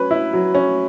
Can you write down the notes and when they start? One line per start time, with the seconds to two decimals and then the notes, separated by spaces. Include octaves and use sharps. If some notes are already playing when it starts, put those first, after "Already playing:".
Already playing: F#3 C#4 B4
0.11 E4
0.33 F#3
0.55 C#4